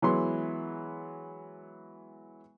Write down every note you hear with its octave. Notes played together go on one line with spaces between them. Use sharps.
E3 F#3 G#3 B3 C6